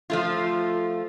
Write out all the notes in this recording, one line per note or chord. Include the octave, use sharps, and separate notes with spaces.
F3 A3 F4